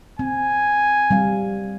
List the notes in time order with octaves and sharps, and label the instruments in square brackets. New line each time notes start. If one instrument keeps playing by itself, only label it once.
[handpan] C4 [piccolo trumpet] G#5
[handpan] G3 C4 F5